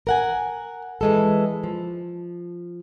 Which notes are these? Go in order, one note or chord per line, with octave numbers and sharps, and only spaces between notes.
A#4 F#5 G#5
E3 G#3 A4
F3